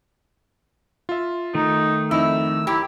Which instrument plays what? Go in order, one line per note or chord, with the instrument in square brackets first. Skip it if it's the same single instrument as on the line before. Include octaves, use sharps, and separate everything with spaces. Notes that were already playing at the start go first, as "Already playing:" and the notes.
[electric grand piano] F4 E5
[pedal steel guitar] D#3 A3 [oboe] D#4
[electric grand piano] F2 D#4 [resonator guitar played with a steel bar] E4 [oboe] E6
[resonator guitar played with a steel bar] F#2 G4 [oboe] E4